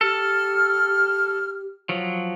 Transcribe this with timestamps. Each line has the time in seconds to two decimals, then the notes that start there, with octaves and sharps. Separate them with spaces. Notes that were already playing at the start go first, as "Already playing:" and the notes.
0.01 G4 A4 F6
1.89 F3 F#3